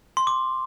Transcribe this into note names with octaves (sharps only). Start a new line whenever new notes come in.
C6
D6